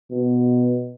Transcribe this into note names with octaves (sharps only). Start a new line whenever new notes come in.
B2